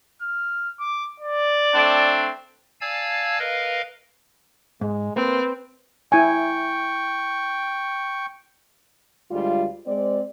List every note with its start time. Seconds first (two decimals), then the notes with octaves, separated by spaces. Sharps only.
0.22 F6
0.80 D6
1.20 D5
1.74 A3 C4 D4
2.81 D5 F5 G#5 A5 E6 G#6
3.39 A#4 B4 D#5 F5
4.81 G#2 G#3
5.16 A#3 C4 B4
6.12 E4 G5 G#5 C#6
9.31 D2 G3 G#3 F4
9.86 G#3 C4 C5 D5